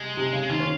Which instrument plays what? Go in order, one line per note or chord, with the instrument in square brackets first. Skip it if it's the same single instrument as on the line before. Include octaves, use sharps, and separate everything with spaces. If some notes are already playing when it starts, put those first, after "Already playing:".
Already playing: [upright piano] C3 [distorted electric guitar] G#3
[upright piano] C3
C#3
[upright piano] D#3 [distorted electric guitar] F4
[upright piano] C#4